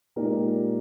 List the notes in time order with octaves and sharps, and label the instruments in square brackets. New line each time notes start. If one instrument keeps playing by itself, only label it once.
[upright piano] A#2 G#3 D#4 G4 A#4